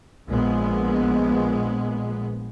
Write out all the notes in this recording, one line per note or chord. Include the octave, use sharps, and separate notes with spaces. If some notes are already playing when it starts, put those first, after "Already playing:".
A#1 G#3 B3